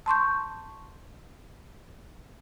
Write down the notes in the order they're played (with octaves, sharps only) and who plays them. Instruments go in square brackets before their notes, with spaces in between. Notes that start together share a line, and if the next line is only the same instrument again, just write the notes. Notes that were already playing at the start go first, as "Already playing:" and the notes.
[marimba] A5 C6 C#6 G6